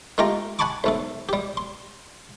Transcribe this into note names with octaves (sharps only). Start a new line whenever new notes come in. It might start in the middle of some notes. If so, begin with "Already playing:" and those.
G#3 A3 F4 G4 G5 A#5
F#5 G#5 A5 B5 C#6 D6
B1 A3 A4
G3 G4
C6